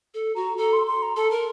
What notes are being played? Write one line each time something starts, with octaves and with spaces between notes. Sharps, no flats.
A4
F#4 A#5
A4 A#5
C6
C6
A#5
A4 A5
A#4